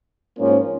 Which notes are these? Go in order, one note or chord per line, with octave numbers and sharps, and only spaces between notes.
G#2 F3 A#3 C#4